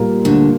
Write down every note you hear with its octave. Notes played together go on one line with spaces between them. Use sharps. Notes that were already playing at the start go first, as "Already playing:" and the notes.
Already playing: A#2 G3 A#3
D2 D3